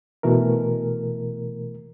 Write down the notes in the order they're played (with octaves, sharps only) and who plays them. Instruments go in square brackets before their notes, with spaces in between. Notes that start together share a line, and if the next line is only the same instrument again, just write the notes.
[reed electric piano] B2 E3 A3 A#4